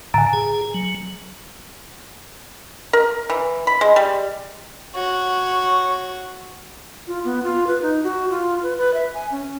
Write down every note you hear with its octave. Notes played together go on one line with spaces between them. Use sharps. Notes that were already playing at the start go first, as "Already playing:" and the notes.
A2 D3 G#5 A#5
G#4
F#3
A#4
E3
B5
G#3
G3
F#4 C#5
F4
B3
F4
B4
D#4
F#4
F4
B4
B4
E5
G#5
C#4